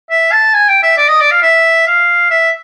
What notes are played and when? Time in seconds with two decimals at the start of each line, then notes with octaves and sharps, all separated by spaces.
0.10 E5
0.32 A5
0.54 G#5
0.69 G5
0.83 E5
0.98 D5
1.09 D#5
1.21 D5
1.31 F5
1.43 E5
1.87 F5
2.30 E5